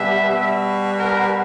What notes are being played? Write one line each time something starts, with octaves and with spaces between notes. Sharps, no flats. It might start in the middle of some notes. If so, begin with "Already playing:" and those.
Already playing: B2 G3 E5
B2 G3
A#4